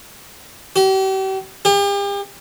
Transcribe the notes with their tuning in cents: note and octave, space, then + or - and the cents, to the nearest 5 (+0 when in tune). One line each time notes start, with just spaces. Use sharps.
G4 -40
G4 +40